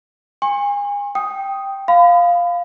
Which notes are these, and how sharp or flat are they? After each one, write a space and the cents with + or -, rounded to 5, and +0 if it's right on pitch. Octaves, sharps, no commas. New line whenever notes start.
G#5 -35 C6 +45
G5 +0 D#6 +0
F5 +0 B5 +35